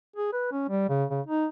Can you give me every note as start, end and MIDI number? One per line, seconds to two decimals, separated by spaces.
0.16 0.31 68
0.33 0.51 71
0.52 0.69 61
0.69 0.87 55
0.89 1.05 49
1.10 1.21 49
1.27 1.47 63